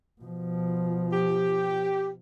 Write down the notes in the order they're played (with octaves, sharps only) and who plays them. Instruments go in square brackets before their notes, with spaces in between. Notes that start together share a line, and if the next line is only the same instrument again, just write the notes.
[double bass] B2 F3
[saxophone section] G4